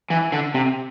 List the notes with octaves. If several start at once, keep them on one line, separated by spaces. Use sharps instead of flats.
E3
D3
C3